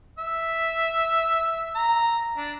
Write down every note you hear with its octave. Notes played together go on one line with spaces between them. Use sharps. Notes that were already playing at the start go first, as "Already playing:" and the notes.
E5
A#5
D4